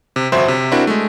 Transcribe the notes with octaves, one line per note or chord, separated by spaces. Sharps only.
C3
G1 F2 F#4 C5 E5 C6
C3
C4 D4 E4 F#4 A#4
G#3 A3